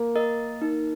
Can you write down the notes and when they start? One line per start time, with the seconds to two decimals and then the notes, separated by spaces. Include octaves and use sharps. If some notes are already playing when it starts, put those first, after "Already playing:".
Already playing: A#3
0.16 A#4 D#5
0.62 D#4